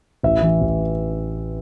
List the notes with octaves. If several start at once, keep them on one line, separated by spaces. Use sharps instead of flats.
A1 E5
E3
A1